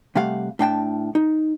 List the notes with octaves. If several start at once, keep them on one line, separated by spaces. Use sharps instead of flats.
C3 G3 A3 G4 F5 F#5
A2 D4 G5 A5
D#4